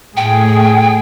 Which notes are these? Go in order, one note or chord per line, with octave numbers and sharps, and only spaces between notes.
A2 G#4 G5